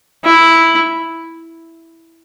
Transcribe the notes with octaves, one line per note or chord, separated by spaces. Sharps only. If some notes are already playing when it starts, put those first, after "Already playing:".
E4